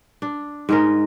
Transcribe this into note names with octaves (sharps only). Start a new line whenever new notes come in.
D4
G#2 G#3 A#4